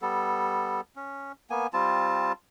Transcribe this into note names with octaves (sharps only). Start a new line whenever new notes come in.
G3 B3 A4
C#4
A#3 B3 G#5
G3 C4 F4 A5